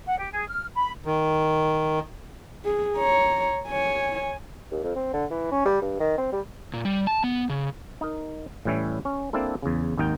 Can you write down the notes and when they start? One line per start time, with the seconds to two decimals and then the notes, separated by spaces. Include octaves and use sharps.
0.06 F#5
0.18 G4
0.32 G#4
0.49 F6
0.75 B5
1.05 D#3
2.65 G#4
2.96 C#5 A#5
3.68 C#5 G#5
4.71 D#2
4.83 F2
4.96 C4
5.14 D3
5.30 E3
5.51 C#4
5.65 G3
5.82 G2
6.00 D#3
6.18 C4
6.32 G3
6.73 A#2
6.85 G3
7.07 A5
7.24 B3
7.49 C#3
8.01 D#4 A#4
8.65 A2 E3 G3 C#4 E4
9.05 C#4
9.33 A#3 C4 D4 E4 A4
9.62 E2 C#3
9.98 G#1 D#2 D#4 A#4 G5